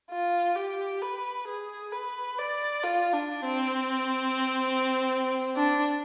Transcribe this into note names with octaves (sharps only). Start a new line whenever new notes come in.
F4
G4
B4
G#4
B4
D5
F4
D4
C4
D4